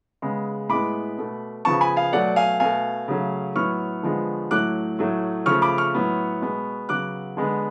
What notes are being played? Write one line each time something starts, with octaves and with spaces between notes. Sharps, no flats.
C#3 G#3 B3
A2 G#3 B3 B5 D6
B2 A3
C#3 F3 B3 A5 C#6
G#5 B5
F5 G#5
B2 F#3 A3 D5 F#5
F5 G#5
B2 A3 F5 G#5
C#3 F#3 A3
A2 F#3 B3 C#6 F6
D3 F3 G#3 B3
A2 F#3 A3 D6 F#6
A2 F#3 A3
C#3 F3 A3 C#6 F6
B5 D6
C#6 F6
A2 F#3 B3
B2 G#3 B3
C#3 F#3 B3 D6 F#6
D3 G#3 B3